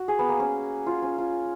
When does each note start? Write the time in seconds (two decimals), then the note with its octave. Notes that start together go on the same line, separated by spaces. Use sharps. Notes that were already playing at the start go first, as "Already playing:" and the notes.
Already playing: F#4
0.08 G#4
0.19 B3
0.29 A#3
0.40 C#4
0.87 F4
1.03 C#4
1.18 F4